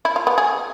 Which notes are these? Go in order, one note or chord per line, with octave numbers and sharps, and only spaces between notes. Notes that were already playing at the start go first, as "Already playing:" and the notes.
E4
F4
B3
G#4